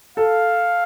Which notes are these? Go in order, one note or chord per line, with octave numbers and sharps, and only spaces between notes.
A4 F5